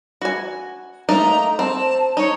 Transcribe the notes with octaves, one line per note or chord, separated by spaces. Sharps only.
F#4 G#5
A3 A#3 D#4 A#5
C4 A5
D#4 C#5